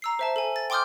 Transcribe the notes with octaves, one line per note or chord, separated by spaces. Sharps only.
A#5 E6 C7
C5 E5 A5
A4 G#5
A6
G5 C6 D6 D#6 F6 G6